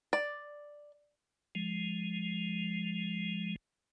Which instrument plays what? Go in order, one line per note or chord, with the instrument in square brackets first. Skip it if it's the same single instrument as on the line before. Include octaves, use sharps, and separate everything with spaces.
[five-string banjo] D5
[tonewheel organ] F3 G#3